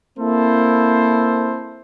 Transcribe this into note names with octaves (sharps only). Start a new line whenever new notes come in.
A#3 C4 E4 A4 C5